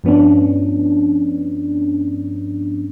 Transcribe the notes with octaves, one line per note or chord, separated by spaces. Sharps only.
G2 F3 B3 C#4 D4